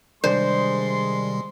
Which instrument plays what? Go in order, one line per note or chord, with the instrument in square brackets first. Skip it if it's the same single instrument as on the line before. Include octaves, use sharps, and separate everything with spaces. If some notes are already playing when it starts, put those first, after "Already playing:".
[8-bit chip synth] C3 D#3 G3 [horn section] G#3 C6 [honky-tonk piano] D4 [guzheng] C5